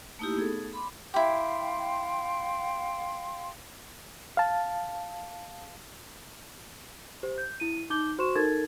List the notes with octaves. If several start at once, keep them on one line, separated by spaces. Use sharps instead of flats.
A3 A#3 D#4 E4 G4
A3 B3 D#4 G#4 A4
B5 C6 D6
E4 G4 F5 G5 C6
F5 A5
G4 C5
G6
E4 D#7
D#4 D6 G6 G7
F#4 C5 C6 C#6 E7
D#4 A4 A#4 G#6 A6